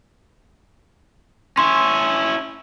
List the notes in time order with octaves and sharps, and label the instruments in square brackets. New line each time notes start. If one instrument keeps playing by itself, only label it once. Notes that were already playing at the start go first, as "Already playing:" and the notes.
[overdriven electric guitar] C#4 E4 [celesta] C6